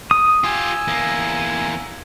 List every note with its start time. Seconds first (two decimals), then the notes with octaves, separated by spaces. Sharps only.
0.11 D#6
0.44 F4 G4 G#5 E6
0.87 E2 A#3